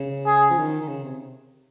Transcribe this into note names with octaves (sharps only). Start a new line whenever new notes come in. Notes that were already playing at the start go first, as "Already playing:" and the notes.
Already playing: C#3
G#4
F3
D#3
D#3
C#3
C3